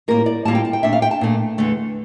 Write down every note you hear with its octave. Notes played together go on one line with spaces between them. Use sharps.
A2 G3 A#3 F4 A#4
D5
A2 G3 A#3 F4 A5
G5
A5
G5
A#2 A3 D4 E5
F5
G5
A5
A#2 A3 D4
E2 D3 A3